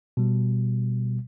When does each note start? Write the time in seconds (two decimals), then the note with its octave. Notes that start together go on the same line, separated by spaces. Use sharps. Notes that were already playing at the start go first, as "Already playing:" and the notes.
0.17 B2 G3